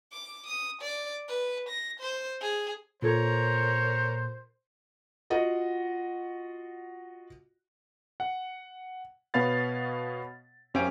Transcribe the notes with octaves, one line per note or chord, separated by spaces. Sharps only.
D6
D#6
D5
B4
A#6
C5
G#4
A#2 F4 A4 A#4 C5 C#5 G#6
F4 F#4 D#5 F#5
F#5
B2 B3 C#5 F5 B5 A6
F#2 C#4 G4 C5 F5 D7